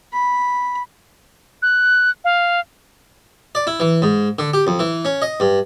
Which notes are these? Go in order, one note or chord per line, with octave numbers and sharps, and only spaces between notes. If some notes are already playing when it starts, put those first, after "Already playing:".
B5
F#6
F5
D5
E4
E3
G#2
D3
G4
F2
E3
C#4
D#5
G2